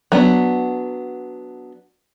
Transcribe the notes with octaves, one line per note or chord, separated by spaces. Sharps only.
F#3 B3 D4